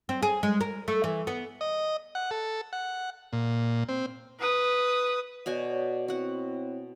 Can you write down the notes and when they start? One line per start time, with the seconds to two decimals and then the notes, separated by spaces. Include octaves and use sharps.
0.09 C4
0.22 G#4
0.43 G#3
0.61 A#4
0.88 A3
1.04 E3
1.27 B3
1.61 D#5
2.15 F#5
2.31 A4
2.73 F#5
3.33 A#2
3.89 C4
4.40 B4 D#6
5.46 B2 F#4 C#5 D5 G#5
6.08 C4 E4 F#4 C#5 F#5